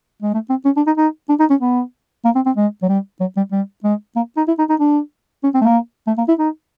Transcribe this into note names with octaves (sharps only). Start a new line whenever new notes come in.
G#3
A3
C4
C#4
D4
D#4
D#4
D4
D#4
C#4
B3
A#3
C4
C4
G#3
F#3
G3
F#3
G3
G3
G#3
A#3
D#4
E4
D#4
D#4
D4
C#4
C4
A3
A#3
A3
A#3
E4
D#4